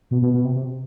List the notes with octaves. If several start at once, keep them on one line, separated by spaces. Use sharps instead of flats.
B2
B2
B2
C3
C3